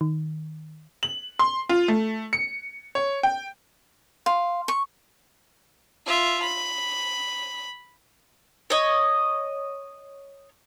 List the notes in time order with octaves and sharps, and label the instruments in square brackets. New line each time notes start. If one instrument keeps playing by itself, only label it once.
[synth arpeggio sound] D#3
[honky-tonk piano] F#7
C6
F4
A3
C#7
C#5
G5
[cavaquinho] F5 [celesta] C6
[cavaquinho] C#6
[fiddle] F4 E5
B5
[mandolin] C#5 D#5